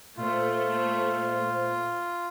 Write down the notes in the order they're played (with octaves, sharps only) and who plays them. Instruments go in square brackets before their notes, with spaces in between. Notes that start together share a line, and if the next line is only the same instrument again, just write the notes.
[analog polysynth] A#2 C5 [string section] A3 [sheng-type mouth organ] F4